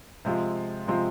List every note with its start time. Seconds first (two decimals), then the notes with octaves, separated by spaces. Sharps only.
0.25 C3 F3 G#3 C4 F4
0.87 C3 F3 G#3 C4 F4